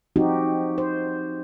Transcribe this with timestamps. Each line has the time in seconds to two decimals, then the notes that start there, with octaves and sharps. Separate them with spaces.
0.16 F3 C4 D#4 F#4 G4
0.78 C5